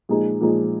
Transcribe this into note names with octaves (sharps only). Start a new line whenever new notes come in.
A#2 F3 G#3 D#4 G#4
A#2 F3 G#3 D#4 G#4